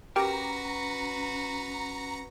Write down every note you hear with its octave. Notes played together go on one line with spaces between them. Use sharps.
C#4 F#4 G4 A#4 B4 G5 A#5